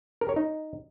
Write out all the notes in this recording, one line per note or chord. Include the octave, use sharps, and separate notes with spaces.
A#4
C#5
D#4